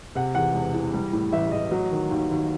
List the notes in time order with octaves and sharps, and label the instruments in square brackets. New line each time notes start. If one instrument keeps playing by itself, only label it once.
[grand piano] C3 F#5
E2 F#5
E1
E3
G3
A2
A1 E5
A1 D#5
F#3
D#3
D#2
D#2